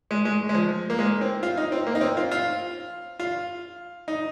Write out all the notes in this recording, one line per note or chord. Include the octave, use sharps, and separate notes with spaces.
G#3
G#3
G#3
F3
A#3
G#3
C4
F4
D#4
C4
A#3
D#4
C4
F4
F4
F4
D#4